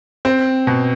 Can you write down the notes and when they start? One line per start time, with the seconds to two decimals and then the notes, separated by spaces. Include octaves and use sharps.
0.25 C4
0.67 B2